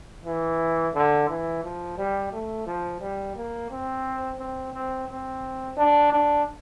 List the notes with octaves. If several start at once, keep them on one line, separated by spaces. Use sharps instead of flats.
E3
D3
E3
F3
G3
A3
F3
G3
A#3
C4
C4
C4
C4
D4
D4